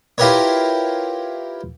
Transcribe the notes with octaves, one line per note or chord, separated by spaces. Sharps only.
E4 F4 G4 A#4 B4 C#5